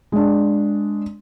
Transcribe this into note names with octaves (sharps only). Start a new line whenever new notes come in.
G#3 D4